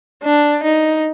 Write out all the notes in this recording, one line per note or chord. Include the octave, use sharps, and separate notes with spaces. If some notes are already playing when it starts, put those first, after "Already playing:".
D4
D#4